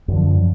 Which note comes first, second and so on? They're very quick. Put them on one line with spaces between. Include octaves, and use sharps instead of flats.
F#2 D3 F3